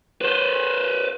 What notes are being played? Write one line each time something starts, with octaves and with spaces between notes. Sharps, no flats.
B4 C5